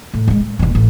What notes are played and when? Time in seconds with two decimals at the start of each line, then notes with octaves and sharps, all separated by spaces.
0.13 A2
0.28 D#3 G#3
0.40 A2
0.59 E1 D#2
0.75 A1